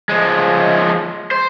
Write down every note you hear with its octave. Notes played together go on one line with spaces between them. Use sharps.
F3 G#3
C5